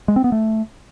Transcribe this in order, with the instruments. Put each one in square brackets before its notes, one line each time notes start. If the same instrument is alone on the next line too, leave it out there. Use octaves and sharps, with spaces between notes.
[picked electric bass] G#3
C4
B3
A3